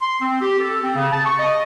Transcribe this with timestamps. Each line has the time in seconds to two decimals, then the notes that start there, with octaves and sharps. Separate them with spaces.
0.01 C6
0.21 C4
0.40 G4
0.59 A4
0.82 C4
0.95 C#3
1.12 A5
1.25 C#6
1.38 D#5